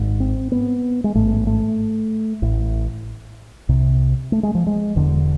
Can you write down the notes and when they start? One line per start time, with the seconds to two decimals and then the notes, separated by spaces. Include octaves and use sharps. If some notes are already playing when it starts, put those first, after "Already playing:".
Already playing: G#1 G#2
0.20 C4
0.52 B3
1.04 G#3
1.15 A1 G#2 A3
1.47 A3
2.42 A1 A2
3.69 C2 C3
4.32 A3
4.43 G#3
4.55 F3
4.67 G#3
4.95 E1 E2 D3